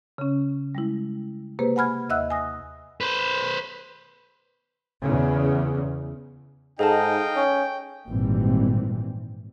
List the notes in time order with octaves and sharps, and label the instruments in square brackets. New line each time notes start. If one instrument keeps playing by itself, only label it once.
[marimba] C#3 C#4
G3 G#3 E4
C3 A#3 G4 G#4 B4 C5
F#5 G#5 B5 F6 G#6
D#2 D#5 E5 F#5 E6 F#6
G#5 D#6 A#6
[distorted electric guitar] B4 C5
[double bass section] E2 C#3
[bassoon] G#2 [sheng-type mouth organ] D#4 D#5 F5 [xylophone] G#4 A4 A5 [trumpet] G5
[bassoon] C#4
[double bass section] G#1 A#2 E3 G3 C4